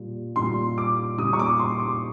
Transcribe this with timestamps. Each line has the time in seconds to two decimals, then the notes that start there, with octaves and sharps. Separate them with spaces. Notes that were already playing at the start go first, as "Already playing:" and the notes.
Already playing: A#2 G3
0.36 A#2 G3 C6
0.78 D6
1.18 G3 D#6
1.22 A#2
1.33 C#6
1.39 D6
1.59 C6
1.80 D6